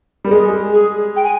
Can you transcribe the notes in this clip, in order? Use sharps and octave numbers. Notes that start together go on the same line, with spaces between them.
G3 A#4
G#3 G#4
G#4
G5
G#5